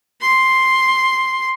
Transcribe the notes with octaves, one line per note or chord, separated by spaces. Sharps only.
C6